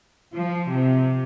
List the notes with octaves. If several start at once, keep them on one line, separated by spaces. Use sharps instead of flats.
F3
C3